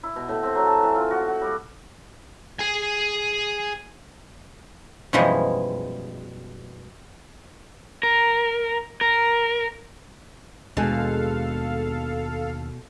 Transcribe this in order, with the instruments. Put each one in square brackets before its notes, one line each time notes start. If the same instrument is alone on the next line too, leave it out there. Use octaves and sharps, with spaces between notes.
[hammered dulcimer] E4
B2
A2
C4
F#3
A5
E3
F4
F#4
F#4
G3
[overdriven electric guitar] G#4 G#5
[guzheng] F#2 B2 E3 F3 G3 G#3
[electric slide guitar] A#4
A#4
[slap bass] D#2 B3 D4 [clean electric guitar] B2 [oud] G#3 [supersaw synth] A4 F5